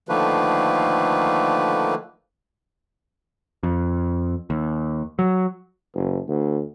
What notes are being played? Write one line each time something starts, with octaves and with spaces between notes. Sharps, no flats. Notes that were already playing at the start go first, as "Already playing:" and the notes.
D3 D#3 F3 A3 A#3 B4
F2
D#2
F#3
F#1
D2